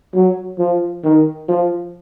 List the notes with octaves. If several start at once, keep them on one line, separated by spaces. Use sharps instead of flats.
F#3
F3
D#3
F3